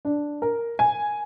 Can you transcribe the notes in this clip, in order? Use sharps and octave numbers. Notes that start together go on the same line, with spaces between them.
D4
A#4
G#5